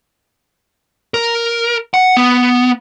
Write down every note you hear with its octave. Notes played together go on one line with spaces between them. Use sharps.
A#4
F#5
B3